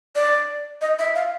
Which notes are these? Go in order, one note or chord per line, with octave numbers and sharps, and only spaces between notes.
D5
D#5
E5
F5